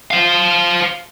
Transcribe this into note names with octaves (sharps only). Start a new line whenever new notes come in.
C5 F5